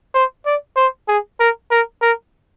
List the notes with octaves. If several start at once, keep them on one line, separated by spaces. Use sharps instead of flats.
C5
D5
C5
G#4
A#4
A#4
A#4